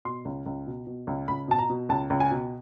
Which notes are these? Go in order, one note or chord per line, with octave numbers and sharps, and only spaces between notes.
B2 C6
C#2
C#2
B2
B2
C#2
C#2 B5
B2 A5
A#5
B2
C#2 A5
C#2
G#5
B2